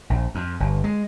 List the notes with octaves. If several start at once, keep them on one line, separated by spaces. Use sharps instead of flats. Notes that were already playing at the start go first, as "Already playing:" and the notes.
A#1
F2
G1
G#3